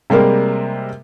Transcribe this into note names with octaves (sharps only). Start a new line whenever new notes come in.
C3 G3 G#3 A#3 A#4